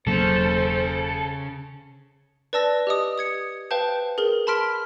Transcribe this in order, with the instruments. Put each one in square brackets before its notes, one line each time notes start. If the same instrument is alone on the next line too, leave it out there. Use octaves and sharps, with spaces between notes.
[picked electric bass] E1 F#3 A#3 [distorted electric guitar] C#3 [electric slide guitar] A4 [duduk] C5
[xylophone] B4 D5 A5 E6 A#6
G4 D#5 D#6
D#6 G#6 C#7
B4 C5 F5 G5 A5 G6
G#4 A#4 G7
A5 B5 C6 F6 B6 D7